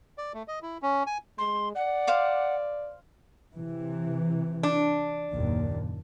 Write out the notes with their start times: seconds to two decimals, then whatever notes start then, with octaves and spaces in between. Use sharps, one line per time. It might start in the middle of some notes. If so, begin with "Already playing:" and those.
0.18 D5
0.34 A3
0.48 D#5
0.62 E4
0.82 C#4
1.07 G#5
1.38 G#3 C6
1.75 D5 F#5
2.07 C5 F5 D6
3.57 C3 E3
4.63 D4
5.33 F#1 D#2 A#2